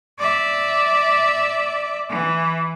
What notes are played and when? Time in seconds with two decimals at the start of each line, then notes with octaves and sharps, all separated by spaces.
0.19 D5 E5
2.09 E3